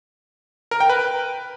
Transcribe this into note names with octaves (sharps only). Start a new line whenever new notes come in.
A#4
G5
B4